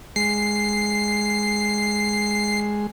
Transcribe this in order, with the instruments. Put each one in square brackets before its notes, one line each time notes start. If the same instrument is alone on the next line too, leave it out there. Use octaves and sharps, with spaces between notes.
[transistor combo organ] G#3 [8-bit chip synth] C7